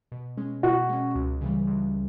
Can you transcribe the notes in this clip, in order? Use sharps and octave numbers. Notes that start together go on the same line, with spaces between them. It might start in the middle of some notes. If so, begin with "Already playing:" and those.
B2
G#3 C#4
B2 F#4
G#3 C#4
C#2
C#3 E3 G3
C#2